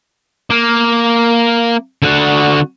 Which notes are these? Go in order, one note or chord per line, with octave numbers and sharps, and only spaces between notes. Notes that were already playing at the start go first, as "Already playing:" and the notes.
A#3
D3 F#4